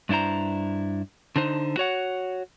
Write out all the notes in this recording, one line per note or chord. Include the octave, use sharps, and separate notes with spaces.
G2 D4 E4 C5 A#5
D3 D4 D#4 C5
F#4 C#5 F#5